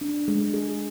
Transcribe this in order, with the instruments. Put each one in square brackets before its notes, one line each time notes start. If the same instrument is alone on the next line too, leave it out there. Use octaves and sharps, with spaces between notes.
[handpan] D4
G#3
G#4